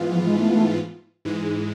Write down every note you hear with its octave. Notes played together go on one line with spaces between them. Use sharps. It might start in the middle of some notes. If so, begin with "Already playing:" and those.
Already playing: G#2 E3 B3 F4
F3
G#3
A3
A3
G#2 E3 G#3